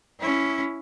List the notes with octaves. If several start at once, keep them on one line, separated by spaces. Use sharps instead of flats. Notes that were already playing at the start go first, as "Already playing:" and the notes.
C#4 E4